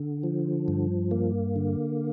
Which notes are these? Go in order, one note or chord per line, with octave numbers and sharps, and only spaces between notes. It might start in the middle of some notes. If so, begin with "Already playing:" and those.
Already playing: D3
F3
G2
A#3
D3